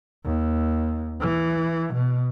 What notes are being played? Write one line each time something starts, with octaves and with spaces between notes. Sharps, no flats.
D#2
E3
B2